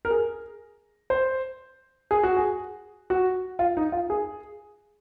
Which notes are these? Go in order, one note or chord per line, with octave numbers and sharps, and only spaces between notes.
A#4
G#4
C5
G#4
F#4
G#4
F#4
F4
D#4
F4
G#4